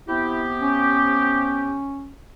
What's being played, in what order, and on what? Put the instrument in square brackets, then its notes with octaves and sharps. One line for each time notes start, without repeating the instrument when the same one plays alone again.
[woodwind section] C3 B3 G4 [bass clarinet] E4
[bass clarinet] C#4